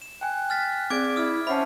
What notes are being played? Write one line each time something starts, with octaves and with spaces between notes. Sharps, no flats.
E7
G5 G#5 F#6
F6 A6 B6
C4 G#4 D5 D6 G#6 D7
E4 D#6 F6
C#4 C5 E5 F#5 A5 B5